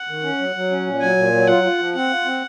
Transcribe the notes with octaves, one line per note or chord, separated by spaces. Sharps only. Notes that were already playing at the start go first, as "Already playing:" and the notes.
Already playing: F#5
D#3
C#4
F#3
F#3
C#4
A#2
F#3 G#5
A#2
F#3
F4 F#5
F4
F3
C4 F#5
F4
C4